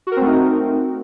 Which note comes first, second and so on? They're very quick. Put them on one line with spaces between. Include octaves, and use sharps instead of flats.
F#4 A#4 C4 A3 D#4